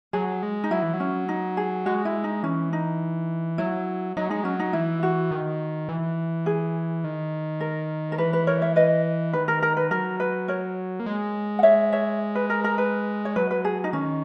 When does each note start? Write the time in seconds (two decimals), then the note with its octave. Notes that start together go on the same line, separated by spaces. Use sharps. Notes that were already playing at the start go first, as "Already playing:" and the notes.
0.13 F#3 G#4
0.43 G#3
0.64 D#4
0.71 F#3 E4
0.82 E3
0.94 F#3
1.00 C#4
1.29 D#4
1.57 G#4
1.86 G#3 F#4
2.05 E4
2.24 D#4
2.43 E3 C#4
2.73 D#4
3.58 F#3 E4
4.17 F#3 D#4
4.30 G#3 D#4
4.44 F#3 C#4
4.59 D#4
4.73 E3 E4
5.03 F#4
5.31 D#3
5.89 E3
6.46 G#4
7.04 D#3
7.60 A#4
8.12 A#4
8.18 E3 B4
8.33 B4
8.47 A#4 C#5
8.62 C#5 E5
8.76 B4 D#5
9.33 D#3 B4
9.48 A#4
9.62 A#4
9.77 B4
9.91 F#3 A#4
10.20 B4
10.48 A#4 C#5
11.00 A#3
11.06 G#3
11.59 F#5
11.63 C#5 E5
11.92 C#5 E5
12.35 B4
12.50 A#4
12.64 A#4
12.78 B4
13.25 C#5
13.36 F#3 B4
13.51 B4
13.65 G#4
13.84 D#4
13.93 D#3 C#4